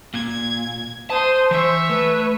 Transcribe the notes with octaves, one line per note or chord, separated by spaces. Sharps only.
A#2 G#6
C5 A5 C6 D#6
E3 C#5 E5
A3 B4